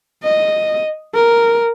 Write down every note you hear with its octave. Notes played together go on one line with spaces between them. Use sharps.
D#5
A#4